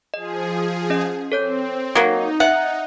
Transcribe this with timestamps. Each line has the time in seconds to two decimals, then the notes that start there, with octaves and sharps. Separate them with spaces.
0.14 F3 G#4 D#5
0.90 C#4 D#5
1.32 C4 A4 C#5 G6
1.95 F#3 A#3 D#4
2.40 E5 F#5